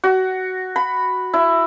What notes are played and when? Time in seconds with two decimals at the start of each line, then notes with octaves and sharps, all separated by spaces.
0.04 F#4
0.76 B5
1.34 E4